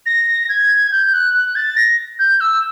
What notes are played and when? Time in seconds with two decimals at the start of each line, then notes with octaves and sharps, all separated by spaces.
0.06 A#6
0.49 G#6
0.92 G6
1.13 F#6
1.34 F#6
1.55 A6
1.77 A#6
2.19 G6
2.41 E6